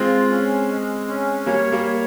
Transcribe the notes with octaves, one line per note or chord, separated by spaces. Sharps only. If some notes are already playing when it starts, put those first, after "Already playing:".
Already playing: G#3 C4 F4
C#4
G#3
C#4
G3 A#3 C#5
G3 A#3
C#5